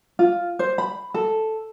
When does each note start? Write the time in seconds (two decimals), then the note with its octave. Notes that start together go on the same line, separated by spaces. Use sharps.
0.19 F4
0.59 C5
0.78 B5
1.14 A4